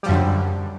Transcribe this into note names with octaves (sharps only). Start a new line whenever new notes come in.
F#2 D3 F3 G3